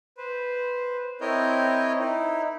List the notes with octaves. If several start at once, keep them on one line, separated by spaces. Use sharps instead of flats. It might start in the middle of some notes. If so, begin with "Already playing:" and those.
B4 C5
C4 E4 A#4 C#5 D#5 G6
D#4 E4